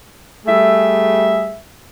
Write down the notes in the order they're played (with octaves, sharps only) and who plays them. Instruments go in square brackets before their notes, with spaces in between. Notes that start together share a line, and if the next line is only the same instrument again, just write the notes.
[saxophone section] G3 A3 G#4 E5